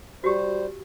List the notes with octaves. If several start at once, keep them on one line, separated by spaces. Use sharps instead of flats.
G3 F#4 G4 C5